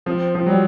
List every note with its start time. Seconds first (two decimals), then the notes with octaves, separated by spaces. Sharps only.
0.06 F3 C4
0.35 F3
0.46 F#3 G3